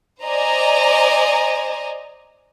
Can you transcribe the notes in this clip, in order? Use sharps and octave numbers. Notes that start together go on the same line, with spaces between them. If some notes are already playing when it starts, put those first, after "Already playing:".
C5 D5 D#5 G#5 A#5